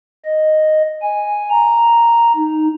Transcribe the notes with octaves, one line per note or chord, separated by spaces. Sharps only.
D#5
G#5
A#5
D#4